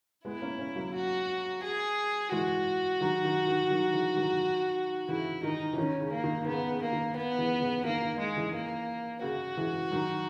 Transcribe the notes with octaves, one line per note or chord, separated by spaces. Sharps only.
G#3 B3 E4
A#3 C#4
A#3 C#4
F#3 A#3
F#4
G#4
E3 G#3 F#4
D#3 F#3
D#3
D#3
D#3 F#3
C#3 E3
D#3 F#3
C#3 E3 E4
D#3 D#4
E3
D#3 C#4
C#3
A#3
D#3
C#3 B3
C#3
A#3
D#3
B3
C#3 E3
C#3 E3
D#3 A#3
D#3
G#3
C#3 E3
A#3
C#3 F#4
C#3 E3
D#3 F#3